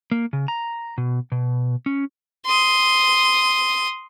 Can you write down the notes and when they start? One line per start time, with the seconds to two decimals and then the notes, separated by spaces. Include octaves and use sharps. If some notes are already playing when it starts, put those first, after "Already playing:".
0.12 A#3
0.33 C#3
0.48 A#5
0.98 B2
1.32 B2
1.86 C#4
2.46 C6 D#6